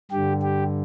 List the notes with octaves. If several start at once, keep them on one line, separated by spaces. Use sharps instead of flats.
G2 D3 G4
G4